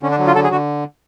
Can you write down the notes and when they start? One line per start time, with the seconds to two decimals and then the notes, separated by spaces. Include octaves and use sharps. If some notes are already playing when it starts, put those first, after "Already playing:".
0.03 D3 C#4
0.11 D4
0.19 F#3
0.27 F4
0.35 D3 A4
0.44 G#4
0.51 D3 F#4